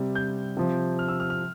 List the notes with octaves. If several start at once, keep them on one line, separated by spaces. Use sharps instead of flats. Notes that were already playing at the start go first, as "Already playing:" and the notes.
Already playing: C3 G3
G6
C3 F3
F6
E6
F6
F6